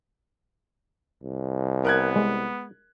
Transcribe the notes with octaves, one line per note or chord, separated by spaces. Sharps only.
C2
B3 A#4 F#6 G#6
G#3